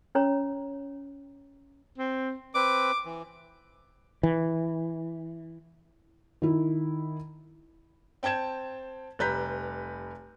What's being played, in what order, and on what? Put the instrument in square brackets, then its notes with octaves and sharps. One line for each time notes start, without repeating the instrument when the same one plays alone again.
[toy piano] C#4 C#5 A#5
[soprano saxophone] C4
[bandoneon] C4 B4 [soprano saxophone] D6
[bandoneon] E3
[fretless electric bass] E3
[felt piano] D#3 E4
C4 G5 A5 G#6 E7
F1 G3 B4 A#5 G6 B6